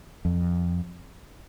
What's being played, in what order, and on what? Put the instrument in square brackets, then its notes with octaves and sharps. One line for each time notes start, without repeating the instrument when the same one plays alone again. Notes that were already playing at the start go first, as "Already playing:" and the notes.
[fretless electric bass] F2